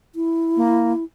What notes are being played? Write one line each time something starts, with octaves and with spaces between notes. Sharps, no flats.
E4
A#3